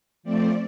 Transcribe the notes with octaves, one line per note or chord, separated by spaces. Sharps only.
F3 A3 C4 D5